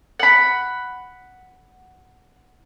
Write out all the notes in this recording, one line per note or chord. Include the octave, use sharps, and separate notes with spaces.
F#5 B5